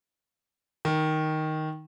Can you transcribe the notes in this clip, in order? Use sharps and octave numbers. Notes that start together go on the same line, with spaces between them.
D#3